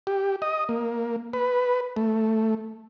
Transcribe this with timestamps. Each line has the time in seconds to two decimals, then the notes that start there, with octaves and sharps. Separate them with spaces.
0.07 G4
0.42 D#5
0.69 A#3
1.33 B4
1.96 A3